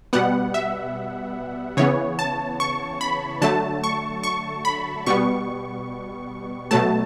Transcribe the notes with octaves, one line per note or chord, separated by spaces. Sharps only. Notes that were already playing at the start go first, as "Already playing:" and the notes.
B2 G3 B3 F#5
E5
C#3 E3 B3 C#5
A5
C#6
B5
D3 F#3 A3 A5
C#6
C#6
B5
B2 G3 B3 C#6
B2 F#3 A3 A5